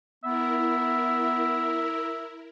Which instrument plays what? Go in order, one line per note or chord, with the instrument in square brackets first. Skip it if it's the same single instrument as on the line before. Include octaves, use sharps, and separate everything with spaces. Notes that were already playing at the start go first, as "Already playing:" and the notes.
[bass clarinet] B3 [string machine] E4 A#4 [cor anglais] E5